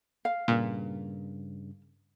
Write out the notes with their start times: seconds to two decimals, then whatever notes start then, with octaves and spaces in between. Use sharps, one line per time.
0.25 F5
0.48 G2 A#2 C#3